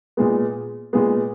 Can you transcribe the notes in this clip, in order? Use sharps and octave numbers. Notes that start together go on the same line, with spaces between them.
A#2 G#3 B3
A#2 G#3 B3